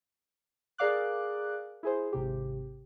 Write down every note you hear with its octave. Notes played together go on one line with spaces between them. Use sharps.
G#4 A#4 D5 F5 D6 F#6
E4 G#4 C5
G#1 C3 G4